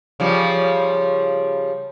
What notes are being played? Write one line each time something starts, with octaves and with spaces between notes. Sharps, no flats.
C#3 F3 G3